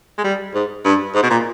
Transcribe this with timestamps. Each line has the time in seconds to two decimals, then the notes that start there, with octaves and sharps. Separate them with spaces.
0.18 G#3
0.24 G3
0.54 G#2
0.85 G2
1.15 G#2
1.23 B2
1.30 A#2